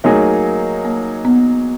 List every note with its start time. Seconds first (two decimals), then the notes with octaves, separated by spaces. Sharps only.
0.04 F#3 A3 A#3 D#4 G#4
0.85 A#3
1.25 B3